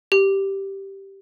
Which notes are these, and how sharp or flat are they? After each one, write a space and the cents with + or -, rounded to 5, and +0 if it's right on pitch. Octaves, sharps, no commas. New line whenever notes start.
G4 -5